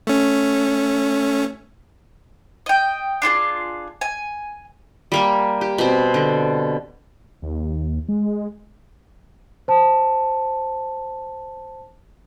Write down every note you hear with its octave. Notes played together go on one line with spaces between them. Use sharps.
A3 C#4
D#5 G5
D4 F4 F#4 G#4
G#5
G3 A#3 G4
G4
B2 C4
D3
D#2
G#3
C5 A5